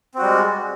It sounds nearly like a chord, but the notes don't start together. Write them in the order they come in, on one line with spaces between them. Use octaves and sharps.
C4 F#4 G3 G#3